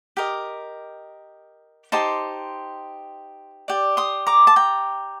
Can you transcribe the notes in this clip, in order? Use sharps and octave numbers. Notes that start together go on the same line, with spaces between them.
G4 A#4 D#5
D#4 G4 C5 A5 C6
G4 D5
C6 D#6
A#5 D6
A5
G5 A#5